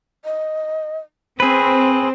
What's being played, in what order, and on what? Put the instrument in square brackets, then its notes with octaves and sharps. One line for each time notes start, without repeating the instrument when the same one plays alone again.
[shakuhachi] D#5
[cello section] C4 [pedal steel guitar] G#4 B4 [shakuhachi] C5